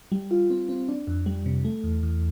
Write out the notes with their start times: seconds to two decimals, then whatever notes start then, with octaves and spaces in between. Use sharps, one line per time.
0.12 G3
0.31 F4
0.50 C4
0.69 C4
0.89 D4
1.07 F2
1.26 G3
1.46 C3
1.65 A3
1.84 E2
2.03 E2